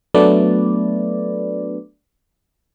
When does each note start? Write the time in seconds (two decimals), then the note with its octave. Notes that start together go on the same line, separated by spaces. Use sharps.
0.14 F#3 A3 B3 D4 B4 D5